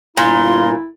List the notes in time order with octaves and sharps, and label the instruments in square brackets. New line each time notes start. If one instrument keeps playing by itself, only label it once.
[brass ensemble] G1 F4 A#5 [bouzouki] A#2 [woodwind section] E4 [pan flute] C6